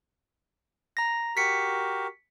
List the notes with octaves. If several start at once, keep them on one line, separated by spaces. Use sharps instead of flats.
A#5 A#6
F#4 G4 A#4 B6 C#7